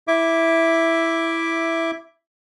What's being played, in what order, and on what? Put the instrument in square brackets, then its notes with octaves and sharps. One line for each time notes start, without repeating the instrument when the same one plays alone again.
[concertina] E4 E5 D6